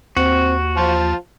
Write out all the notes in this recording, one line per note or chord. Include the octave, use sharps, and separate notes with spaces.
D#2 C4 F#4
F3 F4 C5 A5